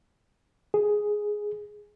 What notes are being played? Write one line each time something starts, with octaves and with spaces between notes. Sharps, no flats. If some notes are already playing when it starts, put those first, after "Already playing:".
G#4